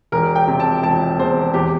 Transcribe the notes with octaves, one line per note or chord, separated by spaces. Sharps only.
E1 A#4
G5
C3
A5
E1 A5
E2 C5
E2 G4